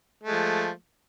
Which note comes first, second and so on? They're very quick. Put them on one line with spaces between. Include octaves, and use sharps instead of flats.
A3 G#3 F3